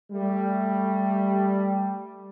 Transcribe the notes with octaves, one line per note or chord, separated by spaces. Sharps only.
G3 A3